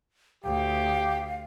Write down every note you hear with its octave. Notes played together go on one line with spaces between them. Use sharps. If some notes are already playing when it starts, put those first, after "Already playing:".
D2 G4 F5